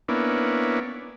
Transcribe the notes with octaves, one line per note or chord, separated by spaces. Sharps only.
A#3 B3 C#4 D4 E4